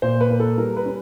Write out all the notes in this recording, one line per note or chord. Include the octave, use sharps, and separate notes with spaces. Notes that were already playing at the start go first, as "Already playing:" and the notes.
A#2 C5
B4
A#3
A4
G3 A#4
B4
C#4